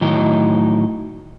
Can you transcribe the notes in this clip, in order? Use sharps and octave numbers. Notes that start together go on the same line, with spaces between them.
A2 D#3 F#3 D#4 E4 D#5